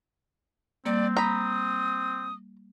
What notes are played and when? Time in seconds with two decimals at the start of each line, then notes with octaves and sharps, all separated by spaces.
0.85 G3 A#3 C4 D5
1.17 A#5 B5 D#6